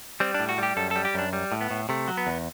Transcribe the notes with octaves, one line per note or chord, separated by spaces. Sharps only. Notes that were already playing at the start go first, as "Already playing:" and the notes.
G3 C4
D4
A2
F#4
G3 G4
F#2 A4
G3 A4
G4
F#2 D4
G3
A2
B3
A2
C3 A3
F#3
B3
E2